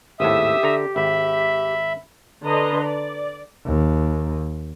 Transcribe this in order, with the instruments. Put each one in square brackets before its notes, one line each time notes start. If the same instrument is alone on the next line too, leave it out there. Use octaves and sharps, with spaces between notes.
[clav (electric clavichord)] G#1 D#2 A2 [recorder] G4 [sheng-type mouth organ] E5 D#6 E6
[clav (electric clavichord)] D3 A#5
[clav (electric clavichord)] G#1 [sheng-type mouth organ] E5 B5
[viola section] D3 B4 D#5 A#5 C6
D5
[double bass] D#2